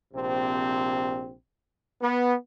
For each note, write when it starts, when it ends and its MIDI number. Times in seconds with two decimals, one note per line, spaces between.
0.14 1.33 34
0.14 1.33 48
0.14 1.33 60
2.01 2.33 59